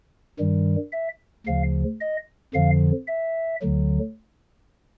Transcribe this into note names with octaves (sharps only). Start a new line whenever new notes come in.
G2 D#3 G3
E5
D2 C#3 F3 F5
D#5
F2 D3 F3 F5
E5
D2 D3 F#3